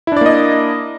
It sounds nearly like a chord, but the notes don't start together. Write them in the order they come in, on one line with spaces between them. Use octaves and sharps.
E4 D4 D5 A#3 D#5